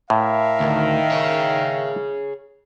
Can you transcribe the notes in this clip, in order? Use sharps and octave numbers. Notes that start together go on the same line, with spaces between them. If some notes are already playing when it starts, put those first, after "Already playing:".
A2 A#4 E5 F5
D2 D#3
G#4 C#5